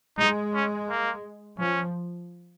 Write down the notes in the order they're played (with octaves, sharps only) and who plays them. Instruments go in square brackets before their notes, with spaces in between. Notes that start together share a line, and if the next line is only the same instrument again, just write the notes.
[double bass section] G#3 [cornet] D#4
[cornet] C#4
A#3
[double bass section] F3 [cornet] C#4